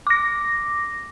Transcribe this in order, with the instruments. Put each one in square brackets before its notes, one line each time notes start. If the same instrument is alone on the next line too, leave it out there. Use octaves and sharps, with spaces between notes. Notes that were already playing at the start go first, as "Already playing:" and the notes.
[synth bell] D6 A#6